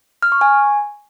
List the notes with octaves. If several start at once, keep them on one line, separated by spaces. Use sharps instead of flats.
F6
C#6
G#5